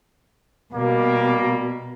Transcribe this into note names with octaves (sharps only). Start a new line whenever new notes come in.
B2 G3 A#3